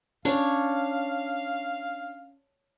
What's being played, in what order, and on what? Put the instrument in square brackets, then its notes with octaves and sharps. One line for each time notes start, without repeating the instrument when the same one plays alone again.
[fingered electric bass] C#4 [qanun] D4 C#5 [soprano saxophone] F5